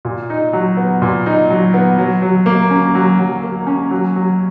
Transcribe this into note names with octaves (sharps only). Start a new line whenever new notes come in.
A#2
D#4
F#3
B3
A#2
D#4
F#3
B3
F#3
F#3
A#3
C#4
F#3
F#3
A#3
C#4
F#3
F#3